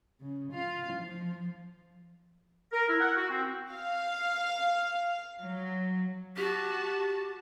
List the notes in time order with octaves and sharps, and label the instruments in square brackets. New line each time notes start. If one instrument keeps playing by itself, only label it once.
[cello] C#3
F4 F5
F3
[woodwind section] A#4
E4
F#5
F#4
C4
[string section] F5
F#3
[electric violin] F#4 A5 [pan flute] G4